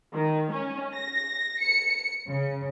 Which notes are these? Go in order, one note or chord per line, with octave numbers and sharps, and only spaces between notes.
D#3
C#4
A#6
C#7
C#3